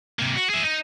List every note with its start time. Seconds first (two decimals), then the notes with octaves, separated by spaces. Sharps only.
0.19 C3 A#3
0.36 F#4
0.50 G#4 E5
0.63 D#4